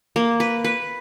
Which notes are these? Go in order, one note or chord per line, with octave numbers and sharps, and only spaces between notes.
A#3
B4
B4